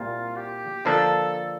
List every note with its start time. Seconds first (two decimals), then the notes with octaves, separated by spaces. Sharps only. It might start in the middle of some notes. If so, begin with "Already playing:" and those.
Already playing: C2 A#2 G3 A#3 F4
0.36 G4
0.85 D3 F3 A#3 D4 A4